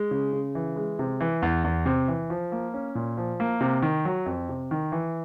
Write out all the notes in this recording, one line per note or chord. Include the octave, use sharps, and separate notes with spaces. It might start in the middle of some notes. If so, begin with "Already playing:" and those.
Already playing: G#3
C#3
C#3
E3
G#3
C3
E3
E2
E2
C3
E3
F3
A#3
C#4
A#2
F3
A#3
C3
D#3
F#3
F2
C3
D#3
E3